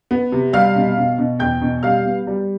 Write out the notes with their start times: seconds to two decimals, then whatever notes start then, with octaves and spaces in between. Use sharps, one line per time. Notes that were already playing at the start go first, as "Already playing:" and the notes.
0.11 B3
0.32 C3
0.53 G3 F5 F6
0.76 B2
0.97 B2
1.19 B2
1.40 E2 G5 G6
1.62 B2
1.83 G3 F5 F6
2.05 B3
2.27 G3